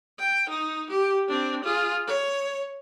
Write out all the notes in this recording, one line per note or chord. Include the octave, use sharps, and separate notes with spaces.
G5
D#4
G4
C4 D4
F4 G#4
C#5